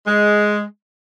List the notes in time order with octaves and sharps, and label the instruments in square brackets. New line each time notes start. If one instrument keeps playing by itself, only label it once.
[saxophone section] G#3